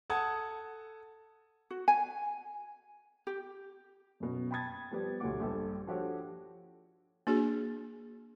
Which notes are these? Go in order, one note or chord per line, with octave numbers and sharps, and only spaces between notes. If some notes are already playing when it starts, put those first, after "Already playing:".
A4 F#5 A5 D#6 G#6
F#4
G#5
G4
F#2 B2
G5 A5 B5 D#6 G#6 A6
F3 G3 B3 G4 D5
D2 B2 F#3 G3 F#5 D6
A#1 G2 G4 A4
F3 D4 F#4 G4 A4 C#5
A#3 D4 F#4 G#4